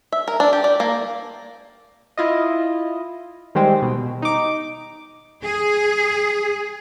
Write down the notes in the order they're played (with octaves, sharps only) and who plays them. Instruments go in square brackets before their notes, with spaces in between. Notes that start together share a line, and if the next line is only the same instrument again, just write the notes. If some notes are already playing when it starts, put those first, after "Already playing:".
[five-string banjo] E5
A#4
D4
G4
D5
A#3
[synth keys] E4 F4 D#5
D#3 G3 G#3 C4
B2
D#4 D6
[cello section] G#4